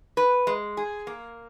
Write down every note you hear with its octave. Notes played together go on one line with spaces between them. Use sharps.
B4
G#3
G#4
A#3